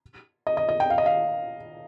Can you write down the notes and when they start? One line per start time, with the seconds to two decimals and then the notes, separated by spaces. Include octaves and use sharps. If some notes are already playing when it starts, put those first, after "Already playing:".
0.47 D#5
0.57 D#5
0.69 D#5
0.80 G5
0.90 F5
0.98 D#5
1.06 F5